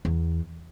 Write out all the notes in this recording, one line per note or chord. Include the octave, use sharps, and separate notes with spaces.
E2